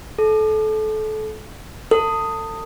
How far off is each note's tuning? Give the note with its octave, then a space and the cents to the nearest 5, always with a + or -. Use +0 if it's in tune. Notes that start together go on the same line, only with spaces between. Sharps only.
A4 -25
A4 +35